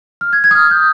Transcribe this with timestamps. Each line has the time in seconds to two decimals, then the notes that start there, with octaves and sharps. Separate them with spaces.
0.21 F6
0.33 G#6
0.44 G#6
0.51 D#6
0.55 F6
0.71 G6